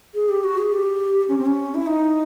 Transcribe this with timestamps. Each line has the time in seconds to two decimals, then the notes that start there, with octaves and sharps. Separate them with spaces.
0.15 G#4
0.29 G4
0.44 F#4
0.58 G#4
0.72 G4
1.29 C#4
1.38 C4
1.46 C#4
1.75 E4
1.86 D#4